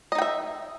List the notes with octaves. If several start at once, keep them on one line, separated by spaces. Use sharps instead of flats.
D#4 D#5 E5 G5